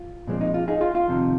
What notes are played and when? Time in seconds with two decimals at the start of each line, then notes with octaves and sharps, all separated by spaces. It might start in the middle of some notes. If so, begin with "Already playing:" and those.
Already playing: F4
0.27 A#2 F3 G#3 C4
0.41 D#4
0.54 F4
0.68 D#4 G#4
0.81 F4
0.95 F4
1.08 F2 C3 D#3